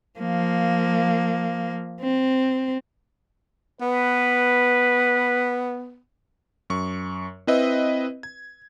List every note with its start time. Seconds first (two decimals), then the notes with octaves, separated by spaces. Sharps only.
0.19 F3 A#3
2.01 C4
3.81 B3 B4
6.70 F#2 C#6
7.47 C4 E4 B4 D#5 E5
8.23 G#6